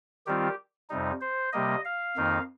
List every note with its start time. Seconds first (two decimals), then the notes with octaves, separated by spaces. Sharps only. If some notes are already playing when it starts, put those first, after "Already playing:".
0.26 D#3 G3 C4 F4 G4
0.90 F2 C3 G3 D#4
1.21 C5
1.52 C3 G3 A#3 D#5
1.85 F5
2.17 F2 D#3 A#3 D#4